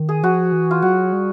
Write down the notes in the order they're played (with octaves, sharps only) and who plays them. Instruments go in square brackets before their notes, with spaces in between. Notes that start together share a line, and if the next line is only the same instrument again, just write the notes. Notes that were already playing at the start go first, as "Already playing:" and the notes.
Already playing: [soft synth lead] D#3
[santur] G#4
[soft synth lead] F3 [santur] F#4
[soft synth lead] E3
[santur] F4
[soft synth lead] F#3 [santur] F#4
[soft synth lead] G3